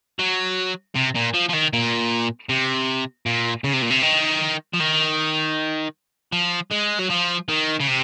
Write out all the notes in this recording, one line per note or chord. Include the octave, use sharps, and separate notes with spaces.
F#3
C3
A#2
F3
F3
D#3
A#2
C3
A#2
C#3
C3
A#2
C3
D#3
F3
D#3
F3
G#3
F#3
F3
D#3
C#3
C3